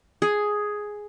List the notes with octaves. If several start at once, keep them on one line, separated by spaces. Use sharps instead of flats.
G#4